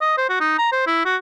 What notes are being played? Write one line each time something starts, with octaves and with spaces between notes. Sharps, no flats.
D#5
C5
F#4
D#4
A#5
C5
E4
F#4